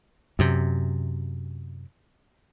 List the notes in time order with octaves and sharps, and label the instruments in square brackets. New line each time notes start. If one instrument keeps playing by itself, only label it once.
[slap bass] F#2 C3